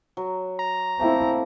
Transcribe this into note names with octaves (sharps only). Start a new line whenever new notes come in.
F#3
A#5
A3 A#3 C4 E4